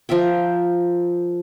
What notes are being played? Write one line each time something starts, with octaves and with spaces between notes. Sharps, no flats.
F3 A#4 E5 G5